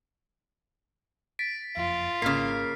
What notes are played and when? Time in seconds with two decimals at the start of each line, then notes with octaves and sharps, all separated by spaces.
1.39 A6 B6 D7
1.77 F#1 F2 F4
2.22 G#1 C#3 A#3 F6 B6 C7